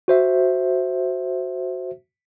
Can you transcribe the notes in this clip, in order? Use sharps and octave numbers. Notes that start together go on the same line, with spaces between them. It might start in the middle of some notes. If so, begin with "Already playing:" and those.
F#4 C5 E5